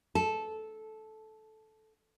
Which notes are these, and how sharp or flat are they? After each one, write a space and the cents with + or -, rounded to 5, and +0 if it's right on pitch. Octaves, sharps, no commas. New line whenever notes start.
A4 -15